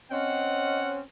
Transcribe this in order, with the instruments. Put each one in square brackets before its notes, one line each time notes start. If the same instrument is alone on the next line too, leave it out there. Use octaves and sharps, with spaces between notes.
[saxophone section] C4 C#4 [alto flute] D#5 [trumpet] F#5